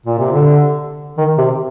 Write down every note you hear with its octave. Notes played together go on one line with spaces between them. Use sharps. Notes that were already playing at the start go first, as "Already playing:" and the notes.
A#2
C3
D3
D#3
C3